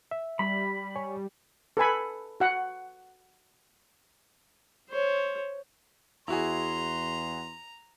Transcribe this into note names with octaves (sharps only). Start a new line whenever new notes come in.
E5
G3 B5
C#5 G#5 C#6
A4 B4 G#5 B5
F#4 F#5
C5 C#5
E2 E4 F#4 G#4 A#5 C6